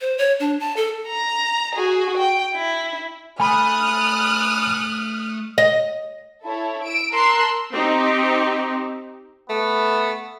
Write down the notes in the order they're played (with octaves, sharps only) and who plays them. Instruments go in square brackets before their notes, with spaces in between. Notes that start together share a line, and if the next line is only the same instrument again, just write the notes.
[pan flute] C5
C#5
D4
A5
A4
[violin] A#5
F#4 G#4
G5
E4
[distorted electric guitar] A3 [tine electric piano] G#5 B5 [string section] D#6 F6 F#6
[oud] D#5
[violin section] E4 A4 C#5
E6 D7
A#4 A5 C6 E6 F#6 C7
[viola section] C4 D#4 G4
[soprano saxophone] A3 [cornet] B3